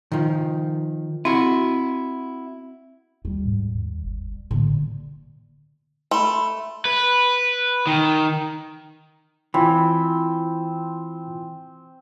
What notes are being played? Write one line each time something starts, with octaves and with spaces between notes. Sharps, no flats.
D#3 F3
C4 E4 F#4
D#2 G3
G#2
D#2
G1
A#1 A2 D3
A3 B5 C6
B4
D#3
E3 C4 F4 G#5 B5